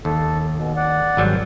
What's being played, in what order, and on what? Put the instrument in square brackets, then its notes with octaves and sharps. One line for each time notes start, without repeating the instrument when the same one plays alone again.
[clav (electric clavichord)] D#2 [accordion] A4
[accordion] B2
D5 F#5
[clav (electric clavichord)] G#1 F#3 G3